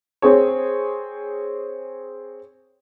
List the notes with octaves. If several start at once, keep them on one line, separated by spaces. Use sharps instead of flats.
C4 G#4 C#5